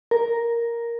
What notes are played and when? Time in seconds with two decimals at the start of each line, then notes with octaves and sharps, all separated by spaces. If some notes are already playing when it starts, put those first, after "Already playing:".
0.11 A#4